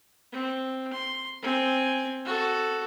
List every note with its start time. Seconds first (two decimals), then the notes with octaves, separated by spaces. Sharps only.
0.32 C4
0.93 C6
1.42 C4 G#5
2.25 F#4 A4